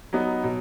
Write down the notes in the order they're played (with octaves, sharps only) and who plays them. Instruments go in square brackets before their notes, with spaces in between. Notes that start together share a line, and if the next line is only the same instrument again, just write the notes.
[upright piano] F#3 B3 D#4
B2 F#3